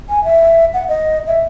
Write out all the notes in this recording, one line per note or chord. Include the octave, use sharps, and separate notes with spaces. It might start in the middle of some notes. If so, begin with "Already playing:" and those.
G#5
E5
F#5
D#5
E5